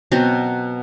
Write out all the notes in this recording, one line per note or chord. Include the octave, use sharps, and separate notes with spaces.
B2 F#3 C4 C#4